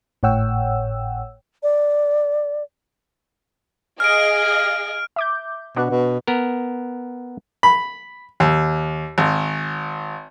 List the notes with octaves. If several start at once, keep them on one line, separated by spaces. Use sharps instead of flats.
G#1 A2 C#5 F#5 G5 E6
D5
G#4 D#5 F5 F6 D7
E5 D6 G6
B2 D4 B4 F#5
B2
B3 A#4
B5
D#2
G#1